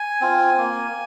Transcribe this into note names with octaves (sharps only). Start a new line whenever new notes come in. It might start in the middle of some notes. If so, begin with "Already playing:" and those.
Already playing: G#5
C4 F4
A#3